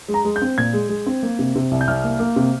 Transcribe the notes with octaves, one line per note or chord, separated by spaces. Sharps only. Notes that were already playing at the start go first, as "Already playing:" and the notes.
G#3
A#5
G#3
G6
C4
A#2 G#6
G#3
G#3
C4
A#3
C3
C3
C2
G6
C2 F6
A#3
A#3
C3